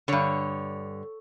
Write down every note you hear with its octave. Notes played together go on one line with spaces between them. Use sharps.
G2 D3 C#5